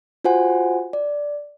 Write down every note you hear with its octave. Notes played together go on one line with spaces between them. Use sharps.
F4 F#4 C5 F#5 G#5
D5